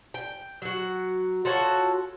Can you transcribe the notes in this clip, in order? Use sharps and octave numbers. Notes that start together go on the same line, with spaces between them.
G5
F#3 F#4
F4 F#4 A4 C#5